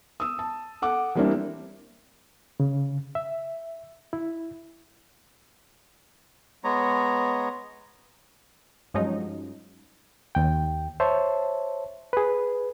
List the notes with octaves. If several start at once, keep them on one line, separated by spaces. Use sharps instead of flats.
D#6 E6
A5
A4 F#5 D6
E3 G3 A#3 C4 D4 E4
C#3
E5
E4
G#3 B3 C#5 A#5
G2 F3 F#3 G#3 C#4 D#4
D#2 G5
C5 C#5 E5 A5
G#4 B4